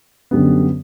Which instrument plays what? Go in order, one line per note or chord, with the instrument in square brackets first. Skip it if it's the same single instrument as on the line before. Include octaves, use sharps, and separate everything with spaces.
[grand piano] F#2 D3 G3 B3